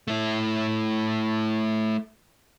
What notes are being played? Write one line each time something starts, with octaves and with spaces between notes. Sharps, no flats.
A3 E4